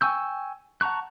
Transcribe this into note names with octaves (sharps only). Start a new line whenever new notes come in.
G5 G#5 C#6 E6 G6
F#5 A5 A#5 C#6 F#6